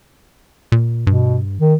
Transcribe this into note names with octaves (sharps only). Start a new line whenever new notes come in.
A#2
G2 B2
D#3